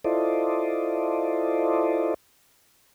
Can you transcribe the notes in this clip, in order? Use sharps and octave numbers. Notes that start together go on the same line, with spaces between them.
E4 F4 A4 C5 D5 D#5